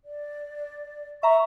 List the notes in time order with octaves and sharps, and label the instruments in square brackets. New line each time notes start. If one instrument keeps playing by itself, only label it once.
[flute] D5
[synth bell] E5 A#5 [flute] C#6